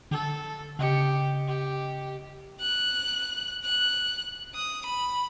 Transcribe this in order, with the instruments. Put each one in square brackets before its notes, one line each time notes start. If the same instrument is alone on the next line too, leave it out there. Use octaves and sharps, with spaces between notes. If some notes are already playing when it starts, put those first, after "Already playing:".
[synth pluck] D3 [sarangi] A4
[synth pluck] C#3 D#5 C#7 [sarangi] G4
[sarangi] G4
[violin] F#6
F#6
D#6
B5